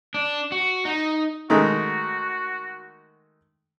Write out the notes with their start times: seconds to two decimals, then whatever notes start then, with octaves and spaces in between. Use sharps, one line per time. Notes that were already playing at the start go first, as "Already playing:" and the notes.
0.14 D4
0.52 F#4
0.85 D#4
1.50 D#3 G#3 A3 F#4